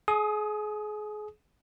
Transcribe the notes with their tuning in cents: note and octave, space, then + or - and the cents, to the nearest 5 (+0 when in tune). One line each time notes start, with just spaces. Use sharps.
G#4 +30 D#6 +0